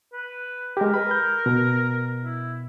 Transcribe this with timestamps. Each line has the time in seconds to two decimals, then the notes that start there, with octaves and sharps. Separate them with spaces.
0.13 B4
0.77 G#3 G4 A#4
0.94 B4 B5
1.11 G6
1.46 B2
2.24 E4